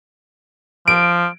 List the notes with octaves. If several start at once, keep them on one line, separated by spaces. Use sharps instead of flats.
F3 D7